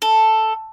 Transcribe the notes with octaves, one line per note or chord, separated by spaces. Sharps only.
A4